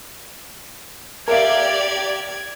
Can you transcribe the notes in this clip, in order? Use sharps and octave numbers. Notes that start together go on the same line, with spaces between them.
G4 A#4 D5 E5 F5 G#6